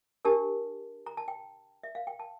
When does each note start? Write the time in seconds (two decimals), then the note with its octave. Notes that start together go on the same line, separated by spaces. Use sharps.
0.25 D4 G4 A#4 A5
1.06 A#5
1.17 A5
1.28 G5
1.83 E5
1.95 F5
2.07 G5
2.20 A5